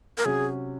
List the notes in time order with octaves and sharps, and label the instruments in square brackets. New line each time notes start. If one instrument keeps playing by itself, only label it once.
[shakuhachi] A#4
[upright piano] C3 F#3 C#4 F#4 [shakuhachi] G#4